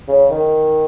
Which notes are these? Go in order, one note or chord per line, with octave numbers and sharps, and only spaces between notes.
C#3
D#3